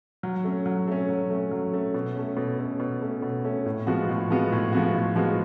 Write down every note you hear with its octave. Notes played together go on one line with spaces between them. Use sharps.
F#3
A3 C#4
F#3
A3 C#4
F#3
A3 C#4
F#3
A3 C#4
B2
A3 C#4
B2
A3 C#4
B2
A3 C#4
B2
A3 C#4
A2
F3 G#3 B3 F#4
A2
F3 G#3 B3 F#4
A2
F3 G#3 B3 F#4
A2
F3 G#3 B3 F#4